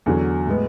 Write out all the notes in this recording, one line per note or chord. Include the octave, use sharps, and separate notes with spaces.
E2 D3 F#3
A2 G#3 B3